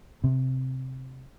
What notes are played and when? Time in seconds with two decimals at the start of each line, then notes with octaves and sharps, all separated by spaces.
0.24 C3